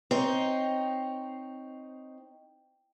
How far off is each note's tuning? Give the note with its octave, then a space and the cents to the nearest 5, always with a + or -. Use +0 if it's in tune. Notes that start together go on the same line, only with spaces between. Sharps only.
C4 +0 D#4 +0 C#5 +0